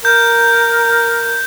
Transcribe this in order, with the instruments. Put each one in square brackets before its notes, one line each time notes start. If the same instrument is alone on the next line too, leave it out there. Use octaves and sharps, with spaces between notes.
[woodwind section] A#4 [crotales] G6